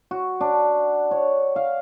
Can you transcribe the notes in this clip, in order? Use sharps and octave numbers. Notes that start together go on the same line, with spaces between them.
F#4
D4
C#5
F5